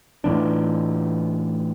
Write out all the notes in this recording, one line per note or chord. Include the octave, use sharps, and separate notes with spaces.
A2 E3 D4